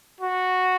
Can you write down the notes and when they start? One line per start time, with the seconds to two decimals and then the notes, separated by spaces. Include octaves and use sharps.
0.21 F#4